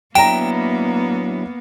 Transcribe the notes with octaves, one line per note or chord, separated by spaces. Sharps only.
F#3 A#3 B3 D4 E4 G5 A#5 E7